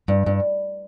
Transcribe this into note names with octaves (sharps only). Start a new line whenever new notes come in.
G2
G2